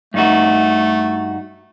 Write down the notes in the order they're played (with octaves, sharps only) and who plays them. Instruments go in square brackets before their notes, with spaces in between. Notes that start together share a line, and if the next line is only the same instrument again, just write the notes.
[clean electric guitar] G2 D#4 F#4 [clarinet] A3